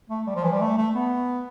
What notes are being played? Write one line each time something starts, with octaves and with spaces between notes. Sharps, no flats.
A3
G3
F3
E3
G3
A3
A3
B3